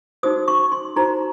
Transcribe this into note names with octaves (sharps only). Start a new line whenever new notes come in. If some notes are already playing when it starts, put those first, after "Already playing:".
D#4 F#4 C5 D#6
C#6
C6
D#4 F#4 C5 A#5